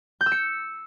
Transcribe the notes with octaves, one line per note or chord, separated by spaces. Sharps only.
G6
E6
C#7